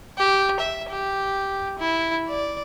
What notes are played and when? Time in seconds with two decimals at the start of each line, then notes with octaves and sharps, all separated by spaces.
0.18 G4
0.60 E5
0.90 G4
1.78 E4
2.28 D5